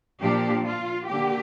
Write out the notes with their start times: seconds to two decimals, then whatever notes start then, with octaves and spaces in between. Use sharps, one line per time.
0.21 A#2 F3 A#3 D4 G4
0.66 F4
1.09 D3 A#3 G4